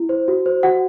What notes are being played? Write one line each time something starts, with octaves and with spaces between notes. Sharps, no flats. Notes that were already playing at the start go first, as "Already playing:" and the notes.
Already playing: E4
C5
F#4
C5
F#4 F#5